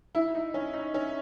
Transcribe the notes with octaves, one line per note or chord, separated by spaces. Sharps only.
E4
D#4
C#4
D#4
C#4